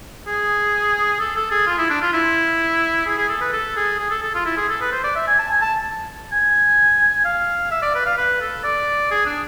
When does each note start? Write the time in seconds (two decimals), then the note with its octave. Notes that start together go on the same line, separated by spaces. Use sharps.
0.27 G#4
1.20 A4
1.36 A4
1.51 G#4
1.67 F4
1.78 E4
1.90 D4
2.02 F4
2.13 E4
3.06 G#4
3.18 G#4
3.29 A4
3.41 B4
3.53 A4
3.76 G#4
3.99 G#4
4.10 A4
4.22 A4
4.34 F4
4.45 E4
4.57 G#4
4.69 A4
4.81 B4
4.92 C5
5.03 D5
5.15 E5
5.27 G#5
5.39 A5
5.50 G#5
5.61 A5
6.32 G#5
7.25 F5
7.71 E5
7.82 D5
7.95 B4
8.06 F5
8.17 B4
8.41 A4
8.64 D5
9.11 G#4
9.25 D4